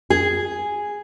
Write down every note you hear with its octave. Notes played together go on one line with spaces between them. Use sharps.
G#4